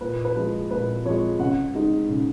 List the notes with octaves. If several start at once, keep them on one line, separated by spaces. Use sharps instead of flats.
A#2 B4
B4
F3 G#3
A#2 B4
F3 G#3 C#5
C#3 F#5
G#3 D#4
C#3